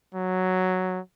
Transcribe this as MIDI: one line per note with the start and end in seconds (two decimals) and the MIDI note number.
0.14 1.00 54